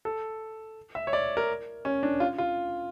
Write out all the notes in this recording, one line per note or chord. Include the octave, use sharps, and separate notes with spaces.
A4
E5
C#5
D5
A#4
C#4
D4
F4
F4